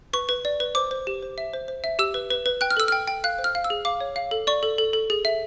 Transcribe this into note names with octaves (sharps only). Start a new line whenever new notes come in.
B4 C#6
B4
D5
B4
C5 D6
C5
G4
C5
E5
C5
C5
E5
G4 E6
B4
B4
B4
G5 F#6
F6
A4 E6
G5 F6
G5
F5 F#6
C5
F6
F5
E6
G#4
F5 D6
C#5
F5
A4
D5 C#6
A4
A4
A4
G#4
E5